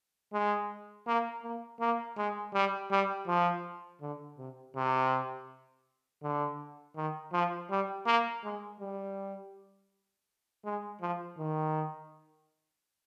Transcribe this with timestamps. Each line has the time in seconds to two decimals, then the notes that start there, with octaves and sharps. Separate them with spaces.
0.33 G#3
1.07 A#3
1.43 A#3
1.80 A#3
2.17 G#3
2.54 G3
2.91 G3
3.27 F3
4.01 D3
4.38 C3
4.76 C3
6.23 D3
6.96 D#3
7.33 F3
7.70 G3
8.06 A#3
8.44 G#3
8.80 G3
10.65 G#3
11.01 F3
11.38 D#3